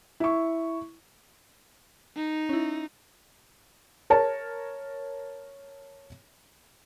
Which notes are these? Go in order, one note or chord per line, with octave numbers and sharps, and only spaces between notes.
E4 C#6
D#4
C#4 E4
A#4 C#5 A5